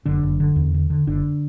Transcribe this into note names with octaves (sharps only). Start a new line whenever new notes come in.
F#1 D3 D4
F#1
D3
E2
D3
D3
F#1 D3 D4